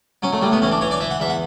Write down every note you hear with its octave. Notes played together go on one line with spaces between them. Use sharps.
F#3 C#4
A3
A2 G3
B3
E3 C#4
D4
E3 C#5
D5
E3 E5
F#5
E2 E5
F#5